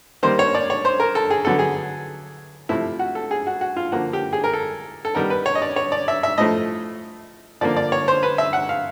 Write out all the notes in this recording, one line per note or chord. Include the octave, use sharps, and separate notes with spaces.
D#3 G3 A#3 C5
C#5
D5
C#5
C5
A#4
A4
G#4
D3 F#3 B3 A4
G#4
C3 F3 A3 E4
F#4
A4
G#4
F#4
F#4
F4
D3 F3 A#3 F#4
G4
G#4
A#4
A4
A4
D#3 G3 B3 A#4
B4
C#5
D#5
D5
C#5
D5
E5
E5
A2 F3 A3 D#5
D3 F3 A#3 D5
D5
C#5
C5
B4
E5
F#5
F5